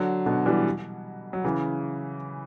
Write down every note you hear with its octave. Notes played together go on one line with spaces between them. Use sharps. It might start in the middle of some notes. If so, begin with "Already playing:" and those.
Already playing: D3 F#3
B2 D3
E3 G3
F#3
C#3 E3